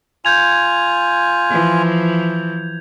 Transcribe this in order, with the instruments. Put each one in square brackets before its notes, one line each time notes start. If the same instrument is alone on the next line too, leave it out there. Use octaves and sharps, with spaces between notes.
[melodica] F4 G#5 [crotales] G6 G#6 F7
[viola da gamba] E3 F3